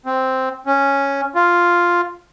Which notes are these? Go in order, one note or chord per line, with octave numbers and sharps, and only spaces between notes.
C4
C#4
F4